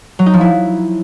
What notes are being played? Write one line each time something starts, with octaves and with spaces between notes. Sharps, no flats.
F#3
D#4
F3
E4